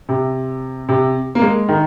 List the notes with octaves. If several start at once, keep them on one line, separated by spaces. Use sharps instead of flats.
C3
C3
A#3
G#3
D#3